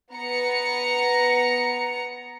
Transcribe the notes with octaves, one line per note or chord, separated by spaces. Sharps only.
B3 A#5 C#7